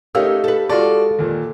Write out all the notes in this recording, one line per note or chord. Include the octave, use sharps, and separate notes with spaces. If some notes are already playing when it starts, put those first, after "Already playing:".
A3 C#4 D#4 G4 A#4 F5 E6
A4 B4
G#3 F4 F#4 A4 D5
D#2 A#2